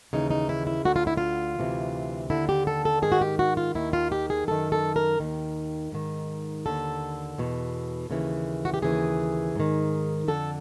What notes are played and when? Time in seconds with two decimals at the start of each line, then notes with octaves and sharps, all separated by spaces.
0.13 D#2 C#3 E3 D#4
0.31 D#4
0.49 E4
0.67 E4
0.85 D2 D3 F#4
0.96 F4
1.07 E4
1.17 F4
1.59 D2 C3 E3
2.30 D#2 D3 E4
2.49 G4
2.67 A4
2.85 A4
3.02 G#2 D#3 G#4
3.12 F#4
3.21 G4
3.39 F#4
3.57 F4
3.75 D#2 D#3 E4
3.93 F4
4.12 G4
4.30 G#4
4.47 F#2 D#3 A4
4.72 A4
4.96 A#4
5.20 D#2 D#3
5.92 G#2 D#3
6.66 D#2 D3 A4
7.38 E2 B2
8.10 D#2 C#3 E3
8.65 F#4
8.74 G4
8.82 D#2 C#3 E3 G#4
9.56 G#2 D#3
10.28 F2 D3 A4